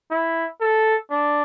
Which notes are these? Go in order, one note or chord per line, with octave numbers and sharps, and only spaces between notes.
E4
A4
D4